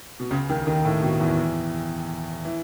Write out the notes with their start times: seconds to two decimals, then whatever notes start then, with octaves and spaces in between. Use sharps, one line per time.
0.20 B2
0.30 C#2 C#3
0.49 D#2 D#3
0.67 D#2 D#3
0.85 A2
1.03 B2
1.20 E2 E3
2.45 E3